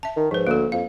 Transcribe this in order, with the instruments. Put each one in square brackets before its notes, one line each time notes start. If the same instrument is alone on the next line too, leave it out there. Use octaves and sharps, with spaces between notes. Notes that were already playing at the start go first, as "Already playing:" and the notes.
[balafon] E5 A5
[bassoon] D#3
[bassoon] G#2 [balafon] F3 B4
[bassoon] D2 [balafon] A#3 A4
[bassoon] F2 [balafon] F5